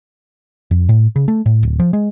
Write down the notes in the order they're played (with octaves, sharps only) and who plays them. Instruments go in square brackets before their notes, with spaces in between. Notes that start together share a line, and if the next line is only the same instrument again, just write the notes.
[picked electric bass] F2
A2
C#3
A3
A2
D1
F3
G#3